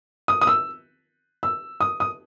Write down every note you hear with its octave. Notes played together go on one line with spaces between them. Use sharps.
D#6
D#6
E6
E6
D#6
D#6